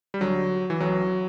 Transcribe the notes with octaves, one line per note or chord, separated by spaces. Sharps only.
G3
D2 D3 F#3
E3
A1 A2 E3 F#3